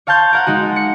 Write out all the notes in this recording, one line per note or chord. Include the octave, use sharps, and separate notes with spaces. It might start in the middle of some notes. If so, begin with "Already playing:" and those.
C#5 F5 A5 C6 G6 G#6
A#4 F5 F#5
G#3 D#4 F#4
C#7